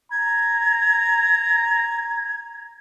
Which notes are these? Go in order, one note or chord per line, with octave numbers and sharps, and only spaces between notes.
A#5 G#6